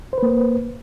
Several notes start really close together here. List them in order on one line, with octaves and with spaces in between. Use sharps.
C5 B4 A#3